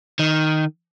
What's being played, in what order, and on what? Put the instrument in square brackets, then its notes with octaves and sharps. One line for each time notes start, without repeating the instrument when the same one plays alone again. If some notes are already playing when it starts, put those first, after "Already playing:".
[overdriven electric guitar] D#3